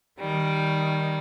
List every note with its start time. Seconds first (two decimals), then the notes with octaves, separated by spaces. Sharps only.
0.19 D#3 G3